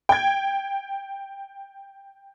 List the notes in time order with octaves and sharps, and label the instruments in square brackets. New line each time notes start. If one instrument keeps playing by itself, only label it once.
[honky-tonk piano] G5 G#6